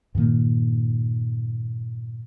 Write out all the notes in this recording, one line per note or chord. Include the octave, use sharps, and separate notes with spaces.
G2 A#2 D#3 A#3